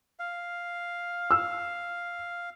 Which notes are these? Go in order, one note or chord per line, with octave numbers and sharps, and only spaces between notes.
F5
E6